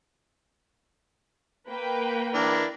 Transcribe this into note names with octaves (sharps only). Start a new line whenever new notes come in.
A#3 B4 G5
E3 D4 A#4